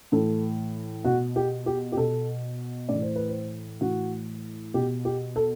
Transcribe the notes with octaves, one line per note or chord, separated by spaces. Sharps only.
A2 E3 A4
B2 F#4
G4
G4
G4
B2 A4
A2 D5
E3
C5
B4
C5
A2 E3 F#4
B2 G4
G4
A4